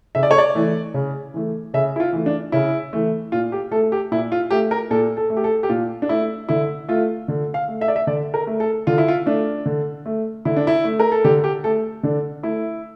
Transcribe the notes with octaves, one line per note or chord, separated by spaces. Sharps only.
C#3 E5
D5
C#5
D5
E3 A3
C#3
E3 A3
C#3 E5
E4
F4
E3 A3
D4
C#3 E4
E3 A3
A#2 F4
G4
A3 A4
G4
A#2 E4
F4
A3 G4
A#4
A#2 A4
A4
A3
G4
A4
G4
A#2 F4
D4
A3 E4
D3 E4
A3 F4
D3
F5
A3
E5
D5
E5
D3 D5
A#4
A3
A4
D3 F4
E4
F4
A3 D4
D3
A3
D3 E4
D4
E4
A3
A#4
A4
D3 G4
G4
A3 A4
D3 D4
A3 E4